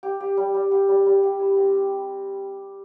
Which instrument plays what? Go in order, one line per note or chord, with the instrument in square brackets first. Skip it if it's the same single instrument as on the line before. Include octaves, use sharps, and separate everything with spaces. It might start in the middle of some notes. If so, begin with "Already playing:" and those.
[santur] G4
G4
G3
G3
G4
G3
G3
G4
E4
C4